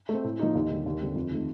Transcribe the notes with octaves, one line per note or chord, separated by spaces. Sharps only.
A3 C4
A2
F3 A#3 D#4
D#2
D3 G3
D#2
D3 G3 C4
F2
D#3 A3